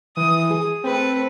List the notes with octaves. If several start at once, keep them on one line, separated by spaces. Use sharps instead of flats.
E3 D#6
G#4
A3 C4 B4